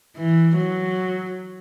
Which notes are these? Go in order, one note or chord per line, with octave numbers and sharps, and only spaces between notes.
E3
F#3